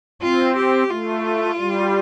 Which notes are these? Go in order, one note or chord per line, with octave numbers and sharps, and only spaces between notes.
C4 F4
G4
A3 F4
G3